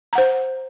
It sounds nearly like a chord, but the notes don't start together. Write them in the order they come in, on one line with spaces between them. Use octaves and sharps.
A#5 F#5 C5